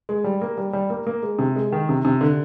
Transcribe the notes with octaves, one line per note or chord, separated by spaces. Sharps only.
G#3
G3
A#3
G3
G3
A#3
A#3
G#3
C3
G#3
D#3
C3
C3
D3